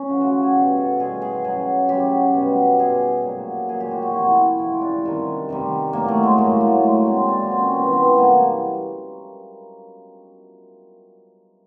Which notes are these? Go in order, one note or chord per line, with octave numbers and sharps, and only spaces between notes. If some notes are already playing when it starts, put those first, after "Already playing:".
Already playing: C#4
C#3 F3 F#4
F#4
G4
G#4
B2 G3 G#4
A4
B2 G3 G#4
G#4
C#3 F#3 G#4
C#3 F#3 G4
B2 G3
B2 G3 G#4
A#2 F#3
A#2 F#3 G#4
G4
F#4
F#4
C3 F3 E4
C3 F3 E4
D4
C3 D#3 G3
C3 D#3 G3
A2 F#3 A#3
A3
G#3
A2 F#3 A#3
A3
A#2 F#3 G#3
C4
A#2 F#3 D4
C4
C#4
C4
C3 E3 G3 B3
C4
B3
C3 E3 G3 A#3